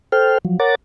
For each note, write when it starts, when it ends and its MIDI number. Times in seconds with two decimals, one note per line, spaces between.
0.12 0.38 69
0.12 0.38 72
0.12 0.38 79
0.12 0.38 89
0.45 0.59 53
0.45 0.59 54
0.59 0.75 70
0.59 0.75 73
0.59 0.75 78
0.59 0.75 82
0.59 0.75 86
0.59 0.75 93